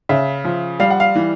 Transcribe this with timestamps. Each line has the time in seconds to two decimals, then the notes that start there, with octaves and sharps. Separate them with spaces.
0.09 C#3 E5
0.45 F3
0.80 G3 F5
0.90 F#5
1.00 F5
1.15 E3